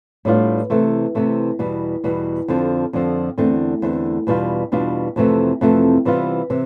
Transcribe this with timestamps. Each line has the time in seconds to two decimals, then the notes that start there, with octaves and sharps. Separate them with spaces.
0.25 A2 G3 B3 D4 F4
0.70 C3 E3 A3 C4
1.15 C3 E3 A3 C4
1.59 E2 B2 G3
2.04 E2 B2 G3
2.48 F2 D3 F3 C4
2.93 F2 D3 F3 C4
3.38 E2 D3 A3 C4
3.82 E2 D3 A3 C4
4.27 E2 B2 G3 D4 F4
4.72 E2 B2 G3 D4 F4
5.16 F2 C3 E3 A3 C4
5.61 F2 C3 E3 A3 C4
6.05 C3 E3 G3 B3 F4
6.50 C3 E3